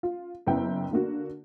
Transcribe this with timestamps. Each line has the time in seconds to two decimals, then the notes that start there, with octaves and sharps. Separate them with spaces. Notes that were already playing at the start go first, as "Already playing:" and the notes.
0.03 F4
0.47 F#1 F#2 B3 E4 G5
0.91 D3 A#3 F#4